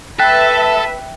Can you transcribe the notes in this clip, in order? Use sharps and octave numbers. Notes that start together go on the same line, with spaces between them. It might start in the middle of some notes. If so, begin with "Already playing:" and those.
A4 B4 E5 G5 F#6 B6